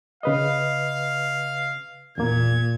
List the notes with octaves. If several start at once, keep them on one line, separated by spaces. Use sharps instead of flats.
C#3 B4 D#5 F5
E2 A#2 A#3 G#6